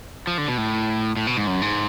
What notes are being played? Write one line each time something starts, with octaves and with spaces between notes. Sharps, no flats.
F3
D3
B2
A2
A2
B2
G#2
F#2
G#2